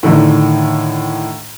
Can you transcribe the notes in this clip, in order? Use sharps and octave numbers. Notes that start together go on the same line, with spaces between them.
A2 D3 D#3